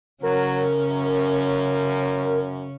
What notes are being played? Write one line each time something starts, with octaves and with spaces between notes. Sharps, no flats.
C#3 F#3 C#4 A#4
F#2